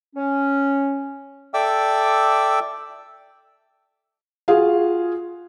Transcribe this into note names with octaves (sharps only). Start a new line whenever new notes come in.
C#4
A4 D5 E5 G5 D6 E6
F4 F#4 G#4 F5